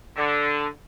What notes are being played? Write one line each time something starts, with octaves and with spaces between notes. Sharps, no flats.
D3